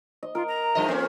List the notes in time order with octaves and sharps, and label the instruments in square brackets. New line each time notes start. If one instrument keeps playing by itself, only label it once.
[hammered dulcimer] D#5
[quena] F4 [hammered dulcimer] A#4
[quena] A#5
[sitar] G2 F3 D#5
F2 A#3 C#4